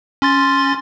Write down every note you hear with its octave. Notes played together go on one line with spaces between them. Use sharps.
C#4 C6 A6